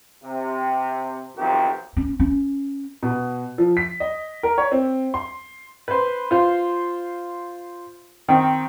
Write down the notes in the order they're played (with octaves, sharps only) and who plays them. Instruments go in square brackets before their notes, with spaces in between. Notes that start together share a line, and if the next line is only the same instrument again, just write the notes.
[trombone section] C3
B1 F2 C3 D#3 G4
[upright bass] C#4
C#4
[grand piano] B2
F3
B6
D#5
A#4
C#5
C4
C6
[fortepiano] B4 C5
F4 C5
D#3 C4